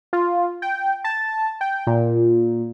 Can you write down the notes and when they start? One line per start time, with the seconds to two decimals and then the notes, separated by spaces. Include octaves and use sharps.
0.13 F4
0.62 G5
1.04 A5
1.61 G5
1.87 A#2